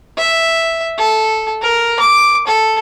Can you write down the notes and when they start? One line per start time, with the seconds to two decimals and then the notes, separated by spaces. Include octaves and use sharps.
0.18 E5
0.98 A4
1.62 A#4
2.00 D6
2.47 A4